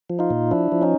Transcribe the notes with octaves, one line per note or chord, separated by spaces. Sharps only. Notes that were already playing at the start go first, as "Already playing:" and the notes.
F3
D#4 F4
A#2
F3 D4 E4
F3
C#4 D#4